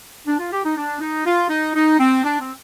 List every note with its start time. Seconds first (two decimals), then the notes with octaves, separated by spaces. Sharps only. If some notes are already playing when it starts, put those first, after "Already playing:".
0.26 D4
0.39 F4
0.51 G4
0.63 D#4
0.76 D4
1.00 D#4
1.25 F4
1.49 D#4
1.74 D#4
1.99 C4
2.23 D4
2.40 C4